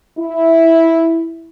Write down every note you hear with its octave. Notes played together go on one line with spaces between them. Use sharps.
E4